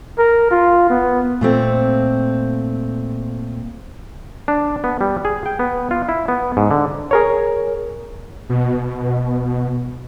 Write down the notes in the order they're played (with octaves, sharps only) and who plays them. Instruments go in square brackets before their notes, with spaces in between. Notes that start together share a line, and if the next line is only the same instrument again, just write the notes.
[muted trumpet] A#4
F4
B3
[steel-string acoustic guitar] A#2 A3 C4
[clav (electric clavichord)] D4
B3
G3
G#4
G5
B3
F4
E4
B3
G#2
D3
[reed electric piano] G#4 A#4 C#5
[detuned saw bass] B2